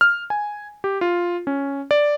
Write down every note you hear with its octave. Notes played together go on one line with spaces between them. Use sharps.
F6
G#5
G4
F4
C#4
D5